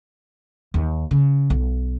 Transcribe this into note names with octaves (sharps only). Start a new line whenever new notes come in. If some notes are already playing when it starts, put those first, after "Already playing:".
D#2
C#3
B1